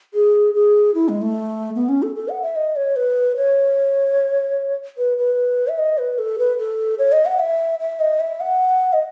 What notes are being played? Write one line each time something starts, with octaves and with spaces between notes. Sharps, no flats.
G#4
G#4
E4
G#3
A3
B3
C#4
A4
A4
F#5
E5
D#5
C#5
B4
C#5
B4
B4
E5
D#5
B4
A4
B4
A4
C#5
D#5
F#5
E5
E5
D#5
E5
F#5
D#5